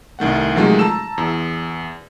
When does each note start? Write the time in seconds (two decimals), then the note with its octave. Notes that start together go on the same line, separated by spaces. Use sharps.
0.19 C2 D#3 A3 F#5
0.55 C3 D#3 F3 F#3 G#3 A3
0.79 A5 A#5 E6 E7
1.18 E2